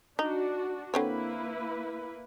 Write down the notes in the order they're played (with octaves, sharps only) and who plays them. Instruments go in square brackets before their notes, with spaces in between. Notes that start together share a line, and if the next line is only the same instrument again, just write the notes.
[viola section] D4 F#4 [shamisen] D#4
[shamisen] D3 C4 C#5 [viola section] A#3 E4 B4